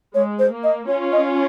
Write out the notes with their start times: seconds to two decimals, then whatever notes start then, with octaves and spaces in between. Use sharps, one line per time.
0.15 G#3 C#5
0.39 C5
0.52 A#3
0.64 D#5
0.88 C#4 F4 C#5
1.13 D#5